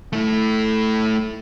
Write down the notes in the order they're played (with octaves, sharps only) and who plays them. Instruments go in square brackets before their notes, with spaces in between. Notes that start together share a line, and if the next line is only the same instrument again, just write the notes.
[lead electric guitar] A3 E4